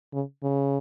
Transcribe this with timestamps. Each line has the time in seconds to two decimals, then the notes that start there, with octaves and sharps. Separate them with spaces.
0.13 C#3
0.43 C#3